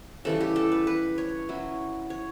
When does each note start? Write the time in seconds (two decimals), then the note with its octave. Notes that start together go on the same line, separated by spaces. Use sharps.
0.25 C#3 E3 G3 A4
0.41 G4
0.56 A4
0.72 B4
0.87 B4
1.18 C#5
1.49 F#3 C#4 E4
2.10 C#5